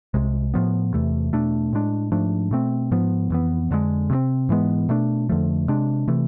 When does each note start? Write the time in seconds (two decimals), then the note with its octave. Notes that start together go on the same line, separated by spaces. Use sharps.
0.14 C2 C3 G#3
0.54 A2 F3 B3
0.94 E2 C3 E3 A3
1.33 E2 B2 A3 D4
1.73 A2 G#3 D4
2.12 G#2 F3 A3 D4
2.51 B2 A3 C4
2.91 G#2 F3 B3
3.30 F2 E3 B3
3.71 F2 D3 G#3
4.10 C3 G#3
4.15 C4
4.49 G#2 E3 G#3 B3
4.89 B2 A3 D4
5.29 F2 D3 F3 A3
5.68 C3 G#3 D4
6.08 C3 E3 A3